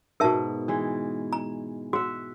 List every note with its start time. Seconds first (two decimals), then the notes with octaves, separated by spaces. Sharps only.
0.20 G#2 B2 A#4 E5 A5
0.68 E3 G#3
1.33 A#5
1.93 F#4 E5 F#5